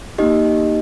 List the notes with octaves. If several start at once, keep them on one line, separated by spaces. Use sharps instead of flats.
A#3 D#4 G4 D#5